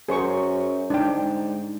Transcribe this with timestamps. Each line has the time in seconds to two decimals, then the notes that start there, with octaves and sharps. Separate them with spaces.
0.08 F#2 G#4 C5 C#6
0.90 G#2 D4 G5